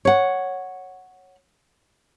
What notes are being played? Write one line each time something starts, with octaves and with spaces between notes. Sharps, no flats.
C#5 F#5